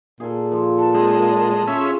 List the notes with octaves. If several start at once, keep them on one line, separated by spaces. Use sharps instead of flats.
A#2 G#4 A4
F3
F#5 A5
G#3 C4
C6
C#4 F4 G#4 E5